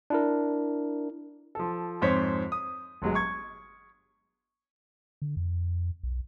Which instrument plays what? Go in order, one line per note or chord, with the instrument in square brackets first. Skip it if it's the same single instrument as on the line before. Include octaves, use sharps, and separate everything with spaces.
[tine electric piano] D4 E4 A#4
[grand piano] F3 A4
F2 G#2 C5 C#5 B6
D#6
G1 F#3 G#3
C#6 G#6
[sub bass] D3
F2
B1